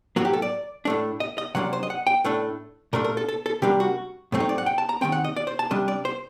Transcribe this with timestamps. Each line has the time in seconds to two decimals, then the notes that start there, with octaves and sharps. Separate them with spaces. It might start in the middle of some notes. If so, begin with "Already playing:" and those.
0.16 A2 F#3 A#3 F#4
0.25 G4
0.33 A4
0.42 D5
0.85 A2 A3 D4
1.20 D#5
1.38 D#5
1.55 C3 F#3 A#3 D4 F#5
1.73 C5
1.83 D#5
1.90 F#5
2.07 G5
2.24 A2 A3 D4
2.93 A#2 A3 D4 A#4
3.05 A#4
3.17 A4
3.28 A4
3.46 A4
3.62 C3 G3 A#3 D4 G4
3.80 F#4
4.32 A2 F#3 A3 C4
4.40 D#4
4.49 D5
4.58 F#5
4.66 G5
4.78 A5
4.89 A#5
5.01 D#3 F#3 C4 G5
5.12 F#5
5.24 D#5
5.36 D5
5.47 C5
5.59 A5
5.71 C3 G3 D4 D#5
5.88 D5
6.05 C5